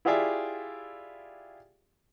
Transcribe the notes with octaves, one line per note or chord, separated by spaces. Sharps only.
E4 F4 G4 G#4 D5 E5